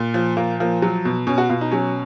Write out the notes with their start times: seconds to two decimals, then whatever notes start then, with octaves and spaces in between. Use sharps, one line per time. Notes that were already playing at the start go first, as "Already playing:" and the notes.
Already playing: A#2
0.14 F3
0.37 A#2 A#3
0.60 F3 A#3
0.82 F#3
1.05 B2
1.27 B2 C#4
1.38 F#4
1.49 B2 F4
1.61 D#4
1.71 F#3 C#4